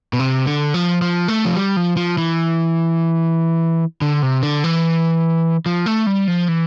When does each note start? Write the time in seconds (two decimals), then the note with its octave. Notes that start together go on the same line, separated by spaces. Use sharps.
0.13 B2
0.19 C3
0.46 D3
0.74 F3
1.02 F3
1.28 A3
1.45 F3
1.55 G3
1.77 F3
1.97 F3
2.18 E3
4.02 D3
4.22 C3
4.43 D3
4.64 E3
5.66 F3
5.86 A3
6.07 G3
6.27 F3
6.48 E3